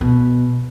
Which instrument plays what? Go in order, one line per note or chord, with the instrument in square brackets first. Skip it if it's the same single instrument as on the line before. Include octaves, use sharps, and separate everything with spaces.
[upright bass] B2